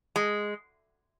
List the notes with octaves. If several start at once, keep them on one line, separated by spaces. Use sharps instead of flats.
G#3